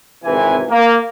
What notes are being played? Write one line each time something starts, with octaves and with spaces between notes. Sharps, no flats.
G#1 C3 E3 B4 G#5
A#3